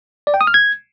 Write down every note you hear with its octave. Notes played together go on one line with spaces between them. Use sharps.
D5
G5
D#6
F6
G#6